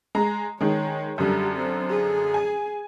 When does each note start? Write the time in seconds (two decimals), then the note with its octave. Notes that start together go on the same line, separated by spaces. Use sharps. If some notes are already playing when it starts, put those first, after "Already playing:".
0.15 G#3 A#5
0.61 D#3 G#3 C#5
1.18 F#2 D3 G3 G4
1.55 C4
1.90 G#4
2.34 G#5